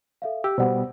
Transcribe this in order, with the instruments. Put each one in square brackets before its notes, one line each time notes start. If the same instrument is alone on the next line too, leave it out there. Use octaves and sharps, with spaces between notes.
[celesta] A4 E5 F5
[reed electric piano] G4 [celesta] E6
[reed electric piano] B2 G3 B3 [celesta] C5 D5 F#5